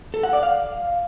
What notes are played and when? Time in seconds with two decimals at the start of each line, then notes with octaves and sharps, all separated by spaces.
0.14 A4
0.23 F#5
0.33 D5
0.43 F5